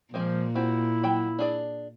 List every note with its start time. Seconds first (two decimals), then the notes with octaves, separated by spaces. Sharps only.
0.14 A#2 F3 G#3 A#3 C4
0.55 C4 E4 F#4
1.03 F#3 G5 B5
1.39 D4 G#4 D5